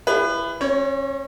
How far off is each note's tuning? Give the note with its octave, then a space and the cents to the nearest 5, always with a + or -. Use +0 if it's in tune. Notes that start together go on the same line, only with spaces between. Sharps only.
E4 +25 G#4 -40 B4 +15
C#4 -35 C#5 +20